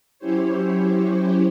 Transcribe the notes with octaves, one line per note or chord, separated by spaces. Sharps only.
F#3 C#4 E4 G4 C5 C#5